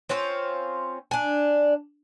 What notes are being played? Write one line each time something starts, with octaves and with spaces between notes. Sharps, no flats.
C4 C#4 F4 C5
D4 G#5